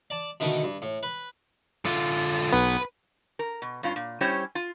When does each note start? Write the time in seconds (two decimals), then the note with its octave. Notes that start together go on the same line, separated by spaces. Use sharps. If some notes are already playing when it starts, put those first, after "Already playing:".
0.10 D5 A5
0.40 B2 D3 D#3 A3
0.64 G2
0.82 A2
1.03 B4
1.85 D3 F4
2.52 B1 B3 B4
3.39 A#4
3.62 B2
3.83 G2 C#4 F4
3.96 A#2
4.21 G3 C#4 E4 G4 C5 C#5
4.55 F4